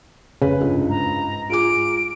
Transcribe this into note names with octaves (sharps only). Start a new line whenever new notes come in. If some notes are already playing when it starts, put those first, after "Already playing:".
F1 C#3 B4
C#2 G2
G#2 A#5
F4 G#4 D6 D7